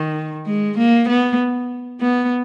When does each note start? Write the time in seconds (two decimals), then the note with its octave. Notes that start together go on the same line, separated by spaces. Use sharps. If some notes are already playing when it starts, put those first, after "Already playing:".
Already playing: D#3
0.46 G#3
0.78 A#3
1.09 B3
2.01 B3